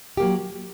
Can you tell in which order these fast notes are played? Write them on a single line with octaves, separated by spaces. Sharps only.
G4 A#3 F#3